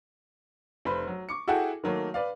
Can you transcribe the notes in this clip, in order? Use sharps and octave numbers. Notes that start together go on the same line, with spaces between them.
F1 B4 C5 B5
F#3
C#6 D6 C#7
E4 F#4 G#4 A4 F#5 G5
D#3 F#3 A3 A#3
B4 D5 F5